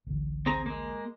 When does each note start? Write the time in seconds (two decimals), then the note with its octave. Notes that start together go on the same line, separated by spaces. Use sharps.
0.07 A1 D2
0.46 C4 G#4 A#5
0.66 G#3 A#3